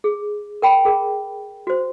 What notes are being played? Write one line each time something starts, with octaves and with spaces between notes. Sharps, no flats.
G#4
A#4 G5 B5
G#4 A#4
F#4 C5